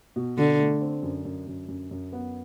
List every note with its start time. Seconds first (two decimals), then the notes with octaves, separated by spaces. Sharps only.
0.16 B2
0.37 B2 D3
0.59 A3
0.81 C4
1.03 F#2
1.25 F#2
1.47 F#2
1.68 F#2
1.91 F#2
2.13 B3